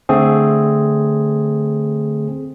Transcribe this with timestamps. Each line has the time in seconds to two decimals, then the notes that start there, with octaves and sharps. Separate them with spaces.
0.09 D3 A3 C4 G#4